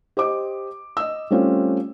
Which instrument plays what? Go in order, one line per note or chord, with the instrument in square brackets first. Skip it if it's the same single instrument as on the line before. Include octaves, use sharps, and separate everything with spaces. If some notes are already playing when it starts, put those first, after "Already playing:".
[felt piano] G4 C5 D#5 D6
D#5 E6
G3 A3 C4 C#4 F4